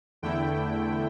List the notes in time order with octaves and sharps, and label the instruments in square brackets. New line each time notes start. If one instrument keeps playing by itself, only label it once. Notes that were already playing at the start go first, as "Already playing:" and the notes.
[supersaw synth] E2 D3 A3 E4 G5